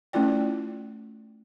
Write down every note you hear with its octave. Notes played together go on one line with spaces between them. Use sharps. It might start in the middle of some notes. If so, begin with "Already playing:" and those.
A3 C#4 E4 F4 D5 G5